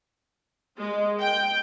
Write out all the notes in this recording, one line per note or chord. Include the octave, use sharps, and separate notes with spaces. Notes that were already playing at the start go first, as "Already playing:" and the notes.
G#3
G5